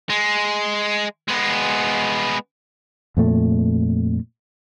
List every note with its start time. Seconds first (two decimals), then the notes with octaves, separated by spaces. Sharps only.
0.10 G#3
1.28 G#3 B3
3.17 F2 A#2 A3